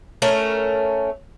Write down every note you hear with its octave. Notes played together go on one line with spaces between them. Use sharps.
A3 C#4 A#4